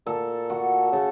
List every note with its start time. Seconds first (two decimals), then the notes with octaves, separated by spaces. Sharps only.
0.06 A#2 A4
0.50 F#4
0.92 C#3 A4